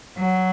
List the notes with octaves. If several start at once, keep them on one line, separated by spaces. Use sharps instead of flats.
F#3